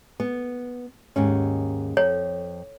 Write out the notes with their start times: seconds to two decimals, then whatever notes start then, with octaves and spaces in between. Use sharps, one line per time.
0.20 B3
1.16 D#2 G#2 C#4
1.97 F2 C#5